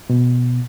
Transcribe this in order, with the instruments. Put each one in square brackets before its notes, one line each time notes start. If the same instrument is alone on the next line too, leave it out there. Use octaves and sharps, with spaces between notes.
[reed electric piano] B2